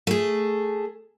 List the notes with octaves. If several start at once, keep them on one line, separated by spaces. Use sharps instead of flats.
A3 G#4